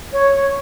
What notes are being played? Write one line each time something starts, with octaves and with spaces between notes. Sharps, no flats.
C#5